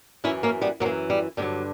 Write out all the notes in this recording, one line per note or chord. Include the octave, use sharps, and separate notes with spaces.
F#2 E3 C#4 E4
A#3 C#4
G3 B3
F#2 F#3 A#3
E3
G3
G2 D3 F#3 G3